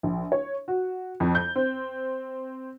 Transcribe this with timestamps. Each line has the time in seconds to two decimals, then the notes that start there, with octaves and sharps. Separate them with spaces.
0.03 A#1
0.32 C#5
0.68 F#4
1.20 F2
1.35 G6
1.55 C4